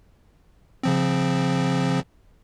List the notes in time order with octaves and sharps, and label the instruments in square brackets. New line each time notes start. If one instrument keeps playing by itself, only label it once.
[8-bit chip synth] C#3 F3 C4